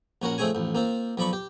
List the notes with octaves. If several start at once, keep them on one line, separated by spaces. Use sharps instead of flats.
A#1 C#4 F#4 A#4 F#5
F2 A3 C4 G#4 C#5 G#5
A1 F2
A#3 C4 F4
B1 F3 D5 B5 C#6
G4